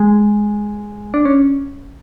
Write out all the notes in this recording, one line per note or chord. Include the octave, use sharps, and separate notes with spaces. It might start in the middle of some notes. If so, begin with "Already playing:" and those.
Already playing: G#3
D4
C#4